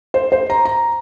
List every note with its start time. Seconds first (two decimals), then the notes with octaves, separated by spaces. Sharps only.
0.14 C5
0.32 C5
0.50 A#5
0.65 A#5